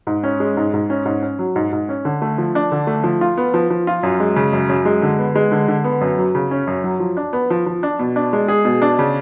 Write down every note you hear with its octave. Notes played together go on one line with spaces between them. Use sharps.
G#2
C#4
G#3
G#2
G#2
C#4
G#2
C#4
F#3
G#2
G#2
C#4
D3
A3
F3
D4
D3
A3
F3
F4
B3
F3
F3
F4
F#2
G#3
C#3
F#2
F#2
G#3
D3
B3
G#3
D3
D3
B3
F#2
F#3
C#3
C#4
F#2
F#3
F3
D4
B3
F3
F3
D4
B2
D4
G#3
G#4
B2
D4
C#3